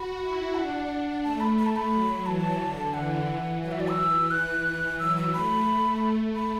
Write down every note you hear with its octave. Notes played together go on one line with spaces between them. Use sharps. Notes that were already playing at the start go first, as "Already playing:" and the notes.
Already playing: F#4 B5
E4
D4 F#5
A3 A5
B5
B5
A5
B5
F#3
E3 A5
D3
E3 F#5
F#3 F#5
E5
D5
E6
E3
F#6
F#3 E6
E6
A3 B5
B5